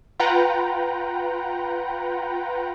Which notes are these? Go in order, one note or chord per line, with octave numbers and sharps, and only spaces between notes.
F4 B4 F#5 G5 A#5